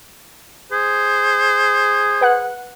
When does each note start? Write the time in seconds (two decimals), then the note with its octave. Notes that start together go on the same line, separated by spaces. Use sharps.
0.72 G#4 C5
2.21 B4 F#5 F#6